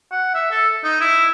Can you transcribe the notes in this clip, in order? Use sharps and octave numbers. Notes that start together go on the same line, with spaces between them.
F#5
E5
A4
D#4
E4